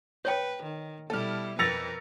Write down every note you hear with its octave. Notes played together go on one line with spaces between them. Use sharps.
B4 C#5 G5
D#3
B2 G3 E4 A4 F6
F2 A#4 B4 E6 A6 A#6 C#7 F7